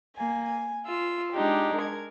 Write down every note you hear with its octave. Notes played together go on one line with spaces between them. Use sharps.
A#3 G#5
G#5
F4 E6
G#3 D4 D#4 G4
A#4 G#6